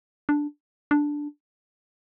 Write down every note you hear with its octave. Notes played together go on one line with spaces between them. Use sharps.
D4
D4